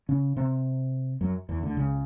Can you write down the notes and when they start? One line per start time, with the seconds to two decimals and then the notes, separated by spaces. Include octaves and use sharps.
0.09 C#3 C#4
0.36 C3 C4
1.21 F#2 F#3
1.49 E2 E3
1.63 D2 D3
1.77 C#2 C#3